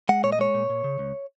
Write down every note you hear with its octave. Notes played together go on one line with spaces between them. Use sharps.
G#3 F#5
A#2 C#5
D#5
G#3 C#5
A#2
A#2
C#3
C#2